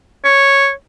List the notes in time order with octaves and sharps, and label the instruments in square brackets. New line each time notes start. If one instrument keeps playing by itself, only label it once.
[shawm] C#5